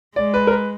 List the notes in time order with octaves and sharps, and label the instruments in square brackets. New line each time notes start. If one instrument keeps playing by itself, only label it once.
[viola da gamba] G#3 [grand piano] D5
[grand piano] B4
A#4
B4